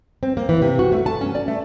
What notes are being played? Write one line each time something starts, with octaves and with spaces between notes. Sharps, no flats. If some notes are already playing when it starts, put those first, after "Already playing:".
C4
A#3
E3
C3
F#4
A3
A5
C#4
D5
A3